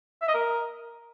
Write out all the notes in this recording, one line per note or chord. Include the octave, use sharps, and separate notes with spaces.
E5
D#5
A#4